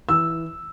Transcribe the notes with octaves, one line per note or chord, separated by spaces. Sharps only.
E3 E6